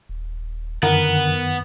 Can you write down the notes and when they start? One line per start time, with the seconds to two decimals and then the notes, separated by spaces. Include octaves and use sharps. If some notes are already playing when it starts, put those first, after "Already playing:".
0.09 D#1
0.83 F#2 D3 D#3 B3 A#4 F#5